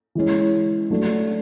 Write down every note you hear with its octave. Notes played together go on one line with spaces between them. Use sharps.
E3 G#3 C#4
F#3 A3 D4